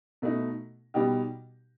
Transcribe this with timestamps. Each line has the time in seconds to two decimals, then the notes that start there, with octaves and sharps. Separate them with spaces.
0.22 B2 A3 D#4
0.94 B2 G3 D#4 G4